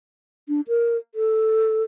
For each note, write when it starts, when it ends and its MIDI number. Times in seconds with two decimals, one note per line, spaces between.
0.48 0.61 62
0.68 0.97 70
1.15 1.83 69